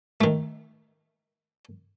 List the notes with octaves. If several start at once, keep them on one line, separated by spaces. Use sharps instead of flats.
D#3 A3